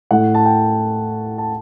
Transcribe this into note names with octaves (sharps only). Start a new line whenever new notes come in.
A2 A3 F#5
A5
G5
A5